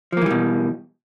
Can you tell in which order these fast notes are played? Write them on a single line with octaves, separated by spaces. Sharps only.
F3 A#3 E3 G3 B2